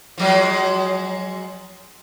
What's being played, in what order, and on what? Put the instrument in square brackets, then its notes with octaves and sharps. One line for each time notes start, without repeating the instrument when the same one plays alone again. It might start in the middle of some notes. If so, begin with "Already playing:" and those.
[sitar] F3 F#3 G#3